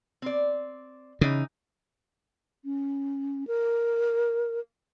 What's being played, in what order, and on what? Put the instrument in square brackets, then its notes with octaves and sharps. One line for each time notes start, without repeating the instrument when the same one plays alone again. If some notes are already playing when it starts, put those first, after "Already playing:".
[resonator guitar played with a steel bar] C4 D5
[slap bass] C#3 [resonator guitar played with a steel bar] E3 D#4
[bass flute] C#4
A#4